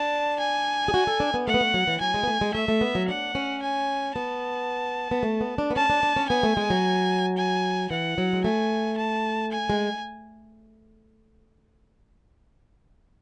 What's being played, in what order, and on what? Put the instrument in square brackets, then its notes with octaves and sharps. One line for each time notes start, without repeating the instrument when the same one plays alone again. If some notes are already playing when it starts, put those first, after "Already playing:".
Already playing: [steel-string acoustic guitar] D4 [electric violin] A5
[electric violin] G#5
[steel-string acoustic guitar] G#4
F#4
A4
D4
B3
[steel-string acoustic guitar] A3 [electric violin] F#5
[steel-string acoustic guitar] B3
A3
F#3
E3
[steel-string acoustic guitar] F#3 [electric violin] G#5
[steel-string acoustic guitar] G#3
B3
A3
G#3
[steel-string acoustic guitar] A3 [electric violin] E5
[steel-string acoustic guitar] A3
B3
F#3
[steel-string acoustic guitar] D4 [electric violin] F#5
[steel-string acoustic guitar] C#4
[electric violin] G#5
[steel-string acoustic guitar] B3 [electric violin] A5
[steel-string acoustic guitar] B3
A3
B3
D4
B3
[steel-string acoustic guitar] C#4 [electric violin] A5
[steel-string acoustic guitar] D4
D4
C#4
[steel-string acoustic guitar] B3 [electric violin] G#5
[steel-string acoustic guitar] A3
G#3
F#3
[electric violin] G#5
[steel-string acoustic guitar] E3 [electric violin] F#5
[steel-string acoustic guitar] F#3
G#3
[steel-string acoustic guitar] A3 [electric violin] G#5
[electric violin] A5
G#5
[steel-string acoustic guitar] G#3